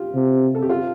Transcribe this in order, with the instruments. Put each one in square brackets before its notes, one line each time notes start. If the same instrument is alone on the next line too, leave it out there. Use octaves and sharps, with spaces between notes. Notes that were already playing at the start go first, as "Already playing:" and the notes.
Already playing: [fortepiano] F4 G4
[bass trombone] C3
[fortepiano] A4
G4
F4